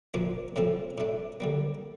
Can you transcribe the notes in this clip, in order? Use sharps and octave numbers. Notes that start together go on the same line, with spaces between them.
A#2 F3 A#3 D4
A2 F3 C4 F4 A4
A2 A3 D4
D3 G3 A#3